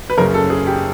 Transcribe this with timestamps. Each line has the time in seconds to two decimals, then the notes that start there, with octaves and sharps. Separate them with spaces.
0.10 B4
0.17 F#1 F#2 C#3 A#4
0.34 A4
0.50 G#4
0.67 G4